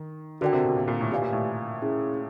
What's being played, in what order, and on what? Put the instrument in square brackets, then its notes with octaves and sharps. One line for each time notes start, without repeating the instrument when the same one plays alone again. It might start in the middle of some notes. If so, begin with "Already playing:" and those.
Already playing: [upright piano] D#3
[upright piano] D3 [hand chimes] F#4 A#4 D5 G5
[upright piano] C3
B2
A#2
A#2
A2
[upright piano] A2 [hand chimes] G4 B4 D5 F5 G#5
[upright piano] A#2
A2
[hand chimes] C#4 E4 G#4